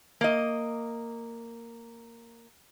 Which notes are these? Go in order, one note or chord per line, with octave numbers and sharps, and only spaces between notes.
A#3 D#5